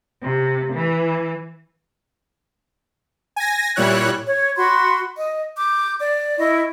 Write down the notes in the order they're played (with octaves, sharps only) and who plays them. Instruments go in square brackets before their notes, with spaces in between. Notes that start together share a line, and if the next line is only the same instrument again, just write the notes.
[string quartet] C3
E3
[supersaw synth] G#5 A#6
A#2 G3 E4 C#5 F#6
[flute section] C#5
F#4 B5 C6
D#5
D6 G6
D5
E4 D#5 C#6